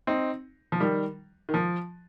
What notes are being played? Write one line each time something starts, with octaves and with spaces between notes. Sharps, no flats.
C4 D#4
F3
D#3 G3
D#3
F3